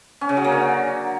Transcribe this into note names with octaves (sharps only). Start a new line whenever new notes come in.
C#4
C#3
F#3
A#3
D3